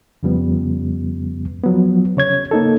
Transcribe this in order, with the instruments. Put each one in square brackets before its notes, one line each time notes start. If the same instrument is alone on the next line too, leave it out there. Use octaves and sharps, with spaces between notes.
[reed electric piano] F2 C#3 F3 G3 B3
F3 F#3 B3
C#3 C#5 G#6
A#3 D#4 A4